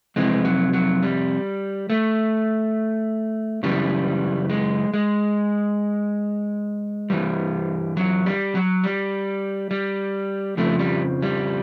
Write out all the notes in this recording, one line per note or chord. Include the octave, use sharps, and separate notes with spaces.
F2 C3 E3 G#3
F#3
F#3
G3
A3
F#2 C#3 E3 G3
G#3
G#3
G2 E3 G3
F#3
G3
F#3
G3
G3
F2 C#3 F3 A3
G3
G3